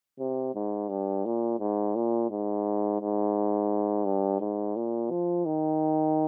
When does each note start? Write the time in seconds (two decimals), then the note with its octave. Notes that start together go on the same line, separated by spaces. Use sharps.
0.19 C3
0.55 G#2
0.89 G2
1.25 A#2
1.59 G#2
1.95 A#2
2.30 G#2
3.00 G#2
4.05 G2
4.40 G#2
4.76 A#2
5.11 F3
5.45 D#3